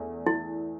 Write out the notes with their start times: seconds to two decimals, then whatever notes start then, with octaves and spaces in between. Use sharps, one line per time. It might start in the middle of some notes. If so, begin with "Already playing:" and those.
Already playing: E2 A3
0.26 E4